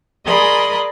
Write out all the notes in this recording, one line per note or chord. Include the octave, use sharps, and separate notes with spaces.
G#4 A#4 D5 D#5 B5 C6